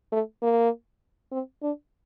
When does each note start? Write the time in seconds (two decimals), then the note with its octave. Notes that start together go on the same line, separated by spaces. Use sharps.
0.12 A3
0.42 A#3
1.32 C4
1.62 D4